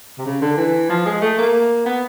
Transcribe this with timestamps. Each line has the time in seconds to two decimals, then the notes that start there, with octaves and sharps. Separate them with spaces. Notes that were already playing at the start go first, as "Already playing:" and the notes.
0.18 C3
0.26 C#3
0.42 D3
0.57 E3
0.89 F3
1.06 G#3
1.21 A3
1.38 A#3
1.86 B3